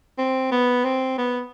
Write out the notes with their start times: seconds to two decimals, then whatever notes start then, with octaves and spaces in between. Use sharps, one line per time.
0.19 C4
0.52 B3
0.85 C4
1.18 B3